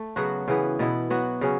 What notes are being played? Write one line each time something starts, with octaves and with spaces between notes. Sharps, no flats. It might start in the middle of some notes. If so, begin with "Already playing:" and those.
Already playing: A3
C#3 F#3 B3 F#4
C#3 E3 B3
B2 B3 E4
F#3 B3 F#4
C#3 F#3 C#4